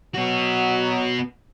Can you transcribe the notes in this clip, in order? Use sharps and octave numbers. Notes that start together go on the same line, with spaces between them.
F#3 B3 F#4